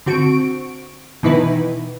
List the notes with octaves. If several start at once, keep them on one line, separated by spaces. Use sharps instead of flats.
D3 C4 F#4 C#6 D7
B2 D#3 E3 D#4 E4 B4